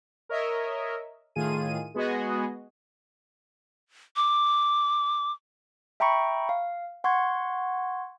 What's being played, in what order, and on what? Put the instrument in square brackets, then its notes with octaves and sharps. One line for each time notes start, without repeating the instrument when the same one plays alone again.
[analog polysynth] A#4 C#5 D#5 E5
A2 D#3 F4 G#4 D#7
G#3 B3 F#4 G#4 D#5
[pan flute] D6
[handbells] E5 G5 A#5 B5 C#6 C#7
F5
F#5 C6 C#6 G#6